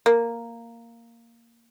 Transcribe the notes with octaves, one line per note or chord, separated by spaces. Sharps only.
A#3